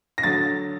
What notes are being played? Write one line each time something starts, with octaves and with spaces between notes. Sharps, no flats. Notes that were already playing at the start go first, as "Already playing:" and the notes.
A#6
D3 F#3 A6